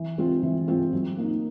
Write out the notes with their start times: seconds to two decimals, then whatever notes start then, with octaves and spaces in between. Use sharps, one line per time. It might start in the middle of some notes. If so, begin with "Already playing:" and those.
Already playing: E3
0.18 G#3 C4 F4
0.43 E3
0.68 G#3 C4 F4
0.93 F#3
1.18 A#3 D#4